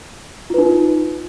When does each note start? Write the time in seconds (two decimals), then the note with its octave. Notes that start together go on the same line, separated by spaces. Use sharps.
0.50 F4
0.54 B4
0.58 D#4